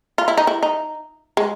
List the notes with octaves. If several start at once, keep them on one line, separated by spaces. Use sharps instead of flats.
F4
E4
D#4
E4
D#4
G#3